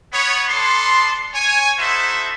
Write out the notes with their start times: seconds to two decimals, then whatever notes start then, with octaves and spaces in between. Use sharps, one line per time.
0.12 B3 C#5
0.48 B3 D4 A4 C6
1.34 C#5 G#5
1.78 D#4 E4 F#4 A4 C5 E5